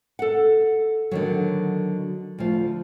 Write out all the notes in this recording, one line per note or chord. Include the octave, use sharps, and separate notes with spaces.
A4 F#5
D3 D#3 F#3
D2 F3